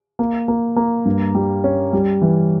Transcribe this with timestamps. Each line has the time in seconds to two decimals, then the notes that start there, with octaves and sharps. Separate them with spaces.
0.19 A#3
0.48 A#3
0.76 A#3
1.05 G2
1.35 G3
1.64 C#4
1.93 G3
2.22 E3